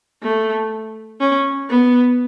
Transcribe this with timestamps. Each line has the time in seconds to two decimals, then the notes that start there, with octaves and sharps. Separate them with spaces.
0.22 A3
1.20 C#4
1.70 B3